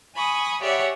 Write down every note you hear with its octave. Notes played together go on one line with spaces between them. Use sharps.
G#5 B5 C#6 D#6
G4 G#4 C#5 D5 E5 F#5